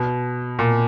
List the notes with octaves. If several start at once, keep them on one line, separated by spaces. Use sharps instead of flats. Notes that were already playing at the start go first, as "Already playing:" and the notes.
Already playing: B2
A#2